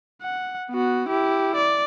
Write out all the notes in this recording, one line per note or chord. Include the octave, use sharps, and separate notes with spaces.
F#5
B3 F#4
E4 G4
D5